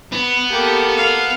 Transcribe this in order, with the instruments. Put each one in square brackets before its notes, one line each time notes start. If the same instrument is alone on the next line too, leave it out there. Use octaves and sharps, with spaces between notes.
[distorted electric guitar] B3
[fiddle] A#3 A4 [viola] G4
[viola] F5